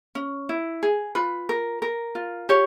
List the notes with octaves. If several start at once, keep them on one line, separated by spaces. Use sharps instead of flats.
C#4
E4
G#4
F4 B4
A#4
A#4
F4
G4 C#5